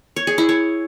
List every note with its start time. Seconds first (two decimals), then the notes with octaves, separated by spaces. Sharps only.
0.16 C#5
0.27 G#4
0.38 E4
0.49 C#5